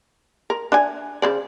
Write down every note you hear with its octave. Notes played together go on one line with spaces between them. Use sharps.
A#4
D4 E5 G#5
C#3 C5 D5